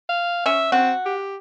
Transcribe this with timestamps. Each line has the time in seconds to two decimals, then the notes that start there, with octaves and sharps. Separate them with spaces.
0.09 F5
0.46 C#4 E5
0.72 C4 F#4
1.05 G4